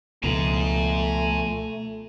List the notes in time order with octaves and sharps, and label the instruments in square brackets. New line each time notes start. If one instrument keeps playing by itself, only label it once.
[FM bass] C#2 [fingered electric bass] B2 F3 [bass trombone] A3 [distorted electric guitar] G#5 A#5